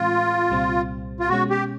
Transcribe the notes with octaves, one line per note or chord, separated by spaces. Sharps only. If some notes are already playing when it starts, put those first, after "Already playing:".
Already playing: A2 E3 G#3 C4 F4
C2 A#2 G3 C4
F4
B2 G#3 C#4 F#4
G4